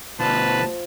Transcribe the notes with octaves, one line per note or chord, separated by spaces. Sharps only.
D2 B2 F3 B4 A5